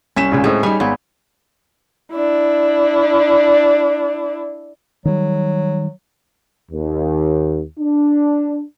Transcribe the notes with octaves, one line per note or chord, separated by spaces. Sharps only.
C2 C#4 B6 E7
G#1 C#2 C#3
A2 G#3 C4 G#4
G3 D#4 B4 C#5 G#5
G#1 B3
D4 E4
D#3 F#3 G3
D#2
D4